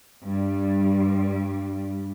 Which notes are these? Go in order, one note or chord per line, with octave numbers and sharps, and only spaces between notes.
G2 G3